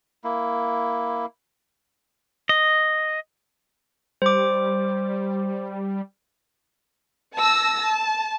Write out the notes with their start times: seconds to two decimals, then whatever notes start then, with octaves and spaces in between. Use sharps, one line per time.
0.24 A#3 E4
2.49 D#5
4.22 G3 C5 D6
7.36 A5 E6 A#6
7.83 A5